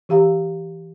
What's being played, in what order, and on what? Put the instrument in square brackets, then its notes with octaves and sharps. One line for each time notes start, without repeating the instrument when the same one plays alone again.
[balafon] E3 G4 F5 A#5